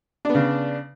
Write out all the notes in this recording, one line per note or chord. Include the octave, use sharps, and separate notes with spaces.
C#3 B3 D4